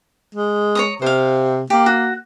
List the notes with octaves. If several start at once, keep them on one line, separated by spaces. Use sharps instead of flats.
G#3
C#5 A#5 D#6
C3 C5 F5
A#3 G4
F#4